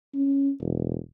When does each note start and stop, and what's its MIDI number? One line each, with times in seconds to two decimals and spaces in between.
0.15 0.50 61
0.60 0.98 28